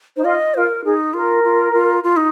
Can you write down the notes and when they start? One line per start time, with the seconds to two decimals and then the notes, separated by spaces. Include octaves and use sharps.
0.16 D#4 C5
0.24 F4 D#5
0.54 F4 C5
0.58 A#4
0.84 D#4 G#4
1.14 F4 A#4
1.44 F4
1.73 F4
2.04 F4
2.17 D#4